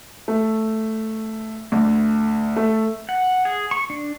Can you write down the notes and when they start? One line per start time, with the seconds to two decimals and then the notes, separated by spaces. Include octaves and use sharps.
0.28 A3
1.72 D2
2.56 A3
3.09 F#5
3.45 G#4
3.71 C#6
3.90 D4